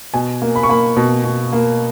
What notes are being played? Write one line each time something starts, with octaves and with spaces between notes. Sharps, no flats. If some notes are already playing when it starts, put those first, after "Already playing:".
B2 G#5
A#3
B5
C#6
A#3 B5
B2
B2
A#3